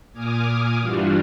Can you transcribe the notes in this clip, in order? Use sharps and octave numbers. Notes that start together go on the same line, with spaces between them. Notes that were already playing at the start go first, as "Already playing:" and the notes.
A#2 G#5 D6 D#6 F6
G2 E3 G3 D4 F4 F#4